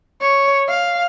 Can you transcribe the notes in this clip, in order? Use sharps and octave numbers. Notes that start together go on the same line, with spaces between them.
C#5
F5